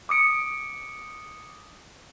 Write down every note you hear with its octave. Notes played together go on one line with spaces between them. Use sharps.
D6 D#6 C#7 D7